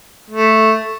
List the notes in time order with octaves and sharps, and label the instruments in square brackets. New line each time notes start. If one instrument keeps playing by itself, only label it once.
[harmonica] A3